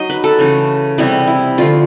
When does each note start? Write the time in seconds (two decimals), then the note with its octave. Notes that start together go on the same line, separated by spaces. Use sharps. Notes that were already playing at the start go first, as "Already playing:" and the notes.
Already playing: F#3 D#4 D#5
0.10 B4
0.24 A4
0.39 C#3 E3 A3
0.98 C3 E3 G3 B3 E4
1.28 E4
1.58 D3 F3 A3 F4